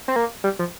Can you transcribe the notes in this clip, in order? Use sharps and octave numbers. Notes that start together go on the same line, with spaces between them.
C4
A#3
G3
F3